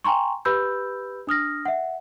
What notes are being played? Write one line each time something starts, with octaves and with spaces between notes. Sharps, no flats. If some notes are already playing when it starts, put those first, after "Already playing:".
G5 G#5 A#5 C6 C#6
G4 B4 B5 E6 G6
D4 D#6 F6 A#6
E5 F#5